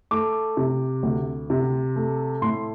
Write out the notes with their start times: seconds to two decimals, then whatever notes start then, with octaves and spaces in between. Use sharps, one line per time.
0.11 A3 D6
0.57 C3
1.03 D2
1.50 C3
1.96 A3
2.42 A2 C6